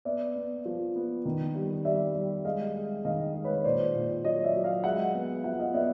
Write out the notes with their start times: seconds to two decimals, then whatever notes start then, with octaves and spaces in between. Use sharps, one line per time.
0.05 B3 D5 E5
0.35 B3
0.65 F3
0.96 B3
1.25 D#3
1.55 G3
1.85 G3 D5 E5
2.15 G3
2.45 G#3 D#5 F5
2.75 G#3
3.05 D#3 D#5 F5
3.35 G#3
3.45 B4 C#5
3.64 A#2 C5 D5
3.95 A#2
4.24 F#3 C#5 D#5
4.44 D5 E5
4.55 F#3
4.64 D#5 F5
4.84 G#3 E5 F#5
5.14 B3
5.44 F3 E5 F#5
5.59 D#5 F5
5.74 B3 D5 E5